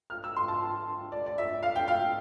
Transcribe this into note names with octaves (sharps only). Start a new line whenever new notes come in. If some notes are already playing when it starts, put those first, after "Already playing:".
F6
E6
C6
A5
D5
D5
E5
F5
G5
F5